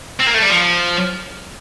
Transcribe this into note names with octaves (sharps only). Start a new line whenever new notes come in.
C4
A#3
A3
G3
F3